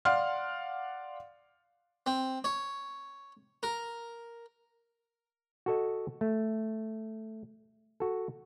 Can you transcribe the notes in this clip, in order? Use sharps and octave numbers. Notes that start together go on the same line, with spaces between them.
D5 F5 F#5 C6 F6
C4
C#5
A#4
F#4 A4 D#5
A3
F#4 A4